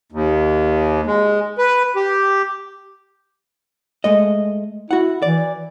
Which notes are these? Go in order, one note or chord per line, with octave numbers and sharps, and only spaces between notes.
D#2
G#3
B4
G4
G#3 A3 D#5
E4 F#4 F#5
E3 D5